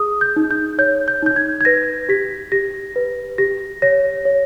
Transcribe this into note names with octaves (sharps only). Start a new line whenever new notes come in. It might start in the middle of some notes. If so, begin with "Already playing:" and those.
Already playing: G#4 D#6
G6
D#4
G6
C#5 G6
G6
D#4 G6
G#6
G#6
B4 A#6
G4 B6
G4 A#6
B4
G4 A#6
C#5 A#6
C#5